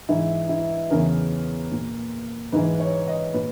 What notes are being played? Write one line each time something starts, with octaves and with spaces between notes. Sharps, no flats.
G#2 E3 E4
E4
E2 C#3 E3 A#4
A#2
G#2 E3 B4
C#5
D#5
A#2 B4